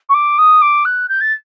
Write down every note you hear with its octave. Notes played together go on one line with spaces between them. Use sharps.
C#6
D6
D#6
D6
F#6
G6
A6